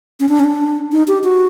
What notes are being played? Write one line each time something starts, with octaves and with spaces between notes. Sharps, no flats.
C#4
D4
C#4
D4
D#4
G4
F#4